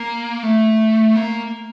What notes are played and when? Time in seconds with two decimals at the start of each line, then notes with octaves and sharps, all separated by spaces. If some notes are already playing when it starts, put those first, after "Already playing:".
Already playing: A#3
0.43 A3
1.16 A#3